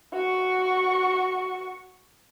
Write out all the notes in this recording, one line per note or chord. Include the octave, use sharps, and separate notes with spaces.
F#4 C#6